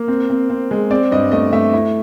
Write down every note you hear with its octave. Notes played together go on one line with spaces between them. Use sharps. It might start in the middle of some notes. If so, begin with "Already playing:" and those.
Already playing: A#3
C4
C4
C4
G#3
C4 D5
G2 D#5
A3 D#5
A3 E5
E4